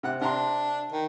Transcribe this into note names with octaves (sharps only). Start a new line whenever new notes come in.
C3 F#5 F#6
C3 D4 A#5 C6
D#3